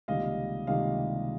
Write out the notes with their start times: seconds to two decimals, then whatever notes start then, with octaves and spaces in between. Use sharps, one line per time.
0.08 C#2 C3 D#3 G3 A#3 D#5 F5
0.67 C#2 C3 D#3 G3 A#3 D#5 F5